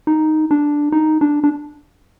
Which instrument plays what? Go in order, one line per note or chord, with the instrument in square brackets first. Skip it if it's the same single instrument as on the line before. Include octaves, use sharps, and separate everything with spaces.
[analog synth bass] D#4
D4
D#4
D4
D4